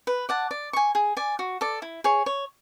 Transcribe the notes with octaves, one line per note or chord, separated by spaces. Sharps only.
B4
D5 F#5 A5
D5
G#5 C#6
G#4
D5 G#5
F#4
A4 D5
E4
G#4 C#5
C#5